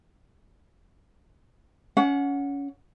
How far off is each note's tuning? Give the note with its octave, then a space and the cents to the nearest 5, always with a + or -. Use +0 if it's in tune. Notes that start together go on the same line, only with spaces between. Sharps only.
C#4 +20 F#5 -15